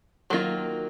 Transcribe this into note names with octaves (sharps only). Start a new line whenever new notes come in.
D#3 F#3 A#3 F4